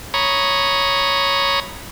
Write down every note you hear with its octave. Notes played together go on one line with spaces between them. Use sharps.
C#5 A#5 B5 C#6 D#6